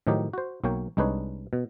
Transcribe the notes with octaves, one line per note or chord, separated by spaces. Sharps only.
A2 D#3 F3 F#3 D#4 G4
F#4 C5
B1 F#3 A#3 C#5 G5
C2 G#3 D4 D#4 B4 C#5
B2